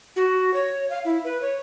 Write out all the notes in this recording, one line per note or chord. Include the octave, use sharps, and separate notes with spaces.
F#4
C#5
F5
E4
B4
C#5